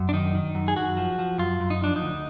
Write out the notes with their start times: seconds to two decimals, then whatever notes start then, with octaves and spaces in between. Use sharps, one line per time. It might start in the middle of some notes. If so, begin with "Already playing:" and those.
Already playing: F#2
0.09 D4
0.13 D#3 D#4
0.35 D#3
0.55 F#2
0.68 G#4
0.76 F#2 F#4
0.97 F3
1.19 F3
1.38 F#2 F4
1.60 F#2
1.70 D#4
1.81 F3 D4
1.96 D#4
2.02 D2